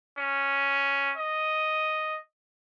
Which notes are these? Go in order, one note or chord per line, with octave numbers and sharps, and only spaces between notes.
C#4
D#5